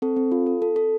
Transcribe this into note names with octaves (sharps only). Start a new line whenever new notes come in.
C4 A4
C4
F4
A4
A4
A4